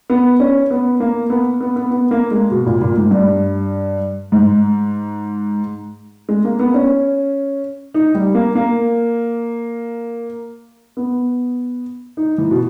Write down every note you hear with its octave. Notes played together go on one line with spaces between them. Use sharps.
B3
C#4
B3
A#3
B3
B3
B3
B3
A#3
G#3
B2
A#2
A#2
G#2
G2
G#2
G#3
A#3
B3
C#4
D#4
G3
A#3
A#3
B3
D#4
E3
B2